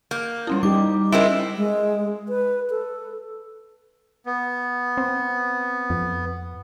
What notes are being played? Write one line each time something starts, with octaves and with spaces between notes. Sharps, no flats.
A#3 G6
G3 C#4 E4
G3 D#4 G4 D6
G#3 C4 C#4 E4 A#4
G#3
B4
A4
B3
C4
F2